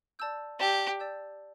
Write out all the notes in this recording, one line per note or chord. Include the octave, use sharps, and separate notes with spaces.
D5 A5 E6 G6
G4 D5 A5 E6 G6
D5 A5 E6 G6